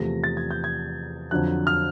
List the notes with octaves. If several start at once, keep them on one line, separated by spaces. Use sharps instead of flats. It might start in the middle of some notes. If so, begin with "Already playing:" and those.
Already playing: E2 C3 F3 A3 A#6
A6
G#6
G6
G#6
F2 D3 F#3 F#6
F6